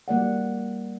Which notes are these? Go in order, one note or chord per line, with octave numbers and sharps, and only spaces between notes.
G3 A#3 D5 F#5